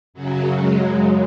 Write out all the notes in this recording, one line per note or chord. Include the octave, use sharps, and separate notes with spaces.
F#2 C#3 F#3
G#3